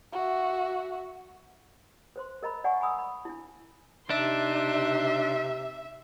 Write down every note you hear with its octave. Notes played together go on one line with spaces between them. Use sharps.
F#4 E5
B4 C5 C6
A#4 D#5 A#5 B5
D5 F#5 G#5 A#5 C#6
F#5 G#5 A#5 B5 D#6 E6
B5
D4 E4
C3 D4 D#4 E5 C6